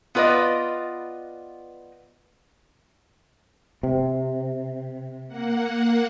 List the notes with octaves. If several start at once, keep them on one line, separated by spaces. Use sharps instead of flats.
B3 F4 B4 D5 D#5
C3
A#3 F#5